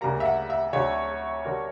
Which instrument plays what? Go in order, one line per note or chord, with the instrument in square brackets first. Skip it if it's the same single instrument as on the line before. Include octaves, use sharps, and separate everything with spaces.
[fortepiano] D2 C#3 G3 A#3 [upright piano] A#5
[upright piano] E5
F#5
E5
[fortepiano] D2 D3 F#3 C#4 [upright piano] C#5
[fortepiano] D3 G3 C#4 F#4 A#4